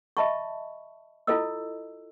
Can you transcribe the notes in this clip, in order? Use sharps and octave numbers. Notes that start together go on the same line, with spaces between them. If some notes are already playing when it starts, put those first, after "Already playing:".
D#5 E5 A5 B5 C#6
E4 F4 A4 D#5 E6